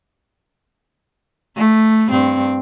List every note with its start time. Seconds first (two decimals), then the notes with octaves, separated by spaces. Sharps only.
1.57 A3
2.09 G2 C4